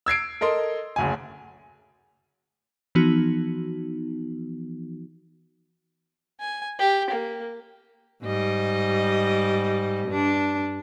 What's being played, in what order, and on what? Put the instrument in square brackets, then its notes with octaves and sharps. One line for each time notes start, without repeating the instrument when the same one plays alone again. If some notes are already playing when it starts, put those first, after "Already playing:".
[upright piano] E6 G#6 C7 D7
A4 A#4 D#5 C6
F#1 D2 G#5
[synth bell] E3 F3 B3 D#4 F#4
[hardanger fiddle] G#5
G4
A#3
[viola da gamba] G#2 G3 D#5
G2 D4